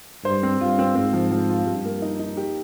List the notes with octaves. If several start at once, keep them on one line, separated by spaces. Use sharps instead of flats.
G2 C5
C4
G2 F4
C4
G#2 C4
F3
F3
F4
G2 G4
A#3
D#4
D#4
G4